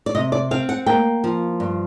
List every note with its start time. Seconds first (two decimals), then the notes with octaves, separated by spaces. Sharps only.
0.06 D5
0.15 C3 D#5
0.32 D5
0.51 C4 F5
0.69 F#5
0.86 A#3 G5
1.24 F3
1.60 G2